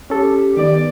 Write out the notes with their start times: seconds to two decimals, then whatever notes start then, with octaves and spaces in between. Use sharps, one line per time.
0.10 C#4 G4 A4
0.57 D#3 B3 D5